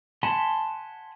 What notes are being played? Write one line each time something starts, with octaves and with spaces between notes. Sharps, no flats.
F#5 G#5 A5 B5 C6